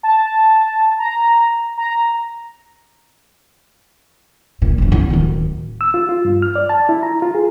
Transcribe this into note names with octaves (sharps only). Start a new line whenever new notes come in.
A5
A#5
A#5
A#2
D#1 F#2
B3 E4
D1 D#3
E6
F4
F4
G2
F6
D5
A5
E4
A#5
F4
G#4